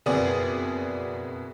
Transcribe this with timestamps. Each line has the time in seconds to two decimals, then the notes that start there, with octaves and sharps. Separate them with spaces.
0.06 F#1 F2 B2 B3 G#4 D5